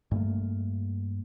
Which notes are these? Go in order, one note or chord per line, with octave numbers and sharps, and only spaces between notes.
G2 A3 A#3